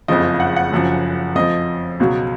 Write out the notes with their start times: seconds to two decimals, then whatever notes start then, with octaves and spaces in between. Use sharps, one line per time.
0.08 F#1 F2 C#3 F3 D#5
0.40 F#5
0.56 F#5
0.72 F#1 F#2 F3
1.35 F2 F3 D#5
2.00 C#2 B2 F#3